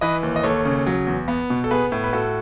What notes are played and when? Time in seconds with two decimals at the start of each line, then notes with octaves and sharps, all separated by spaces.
0.01 E3 B4 D#5
0.23 D#2
0.36 D#5
0.43 D#2 A4 C#5
0.65 C#3
0.87 F#3
1.07 E2
1.28 B3
1.50 B2
1.64 A4
1.71 B3 G#4 B4
1.92 A2
2.04 B4
2.13 A2 F#4 A4